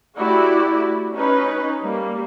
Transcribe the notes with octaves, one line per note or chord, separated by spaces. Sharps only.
A3 E4 F#4 G4 D5
C#4 D#4 B4
G3 A#3